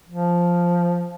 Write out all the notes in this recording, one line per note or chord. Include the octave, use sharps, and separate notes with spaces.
F3